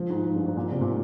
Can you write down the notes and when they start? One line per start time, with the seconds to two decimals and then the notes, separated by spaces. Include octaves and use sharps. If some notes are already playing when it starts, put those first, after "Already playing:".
Already playing: F3
0.10 G#2
0.25 G#2
0.36 G2
0.46 G#2
0.56 A#2
0.72 C3
0.81 A#2